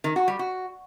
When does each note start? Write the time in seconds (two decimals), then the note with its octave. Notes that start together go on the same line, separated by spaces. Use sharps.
0.04 D#3
0.16 F#4
0.28 G3
0.39 F#4